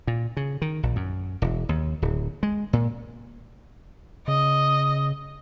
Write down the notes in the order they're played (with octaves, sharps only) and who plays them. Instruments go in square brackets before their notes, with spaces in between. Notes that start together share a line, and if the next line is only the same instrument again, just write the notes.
[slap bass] A#2
C#3
D#3
A#1
F#2
E1
D#2
D1
G#3
A#2
[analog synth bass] C#3 [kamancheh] D#5